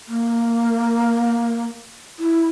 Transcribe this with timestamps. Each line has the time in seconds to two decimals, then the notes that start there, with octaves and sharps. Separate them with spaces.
0.08 A#3
2.19 E4